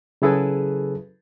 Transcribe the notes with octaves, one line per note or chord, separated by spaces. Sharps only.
C#3 F#3 E4 G#4 A4 B4